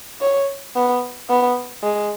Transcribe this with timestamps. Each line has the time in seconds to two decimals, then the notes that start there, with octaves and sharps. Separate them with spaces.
0.21 C#5
0.76 B3
1.30 B3
1.84 G#3